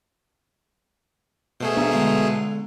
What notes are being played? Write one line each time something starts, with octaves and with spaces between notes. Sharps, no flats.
B2 A3 G#4 C5
G3 B3 D4
D3 G#3 F5